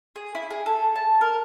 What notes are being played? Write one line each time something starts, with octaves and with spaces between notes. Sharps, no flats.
G#4
E4
G#4
A4
A5
A#4